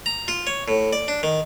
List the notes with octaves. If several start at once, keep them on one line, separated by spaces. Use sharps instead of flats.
A#5
F4
C#5
A2
D5
D4
D#3